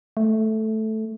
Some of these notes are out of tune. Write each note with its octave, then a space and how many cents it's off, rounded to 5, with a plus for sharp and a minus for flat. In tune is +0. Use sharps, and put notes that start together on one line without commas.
A3 -5